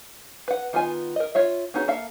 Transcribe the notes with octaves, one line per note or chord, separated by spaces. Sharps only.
B4 F#5
D#3 B3 F4 D#5 G#5
A#4 D#5
F4 C#5 E5
B3 C#4 D#4 F#4 G#4
A#3 A4 E5 F5